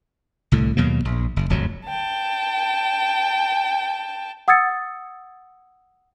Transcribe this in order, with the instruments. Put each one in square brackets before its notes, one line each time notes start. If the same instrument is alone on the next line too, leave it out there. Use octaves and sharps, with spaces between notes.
[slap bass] C2 A2 D3
D#2 B2 F#3 A#3
A#1
F#1
D1 G1 F2 F#3
[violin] G5 A5
[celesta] F#5 D#6 E6 G#6 A6 C#7